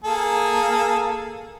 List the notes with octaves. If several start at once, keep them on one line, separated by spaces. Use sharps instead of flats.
A#3 G#4 A4